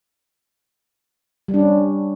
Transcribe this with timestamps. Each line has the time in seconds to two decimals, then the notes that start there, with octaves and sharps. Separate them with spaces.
1.48 G3
1.54 D4
1.59 C#4